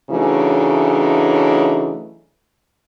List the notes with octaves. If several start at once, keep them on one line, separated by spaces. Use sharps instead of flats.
C#3 E3 F#3 A3 D4 D#4